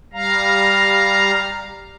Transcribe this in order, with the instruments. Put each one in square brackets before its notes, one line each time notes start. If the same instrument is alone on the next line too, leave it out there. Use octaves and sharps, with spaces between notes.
[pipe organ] G3 F5 A#5